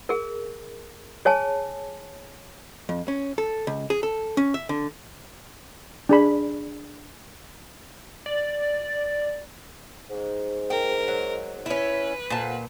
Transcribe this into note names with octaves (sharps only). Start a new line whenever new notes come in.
G#4 A#4
G#4 C#5 G#5 A5
F2
C#4
A4
C#2
G#4
A4
C#4
E5
D3
D4 G#4 B5
D5
G#2
A#4 G5
F#3
C#4 E4 B4
F2 A#2 F4 F#5 A5